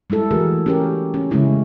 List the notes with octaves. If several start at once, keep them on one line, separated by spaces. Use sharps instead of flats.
G3 G#3 E4 A4
E3 A3 F#4 G#4 A#4
C#4 G4 A#4
C#4
C#3 G#3 A3 C#4 E4